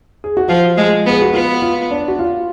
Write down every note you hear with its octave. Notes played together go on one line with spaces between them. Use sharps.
G#4
F#4
F3 F4
G#3
B3 G#4
F#4
B3 F4
F4
D4
F#4
F4